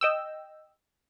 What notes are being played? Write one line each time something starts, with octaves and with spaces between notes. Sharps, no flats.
D#5 G5 E6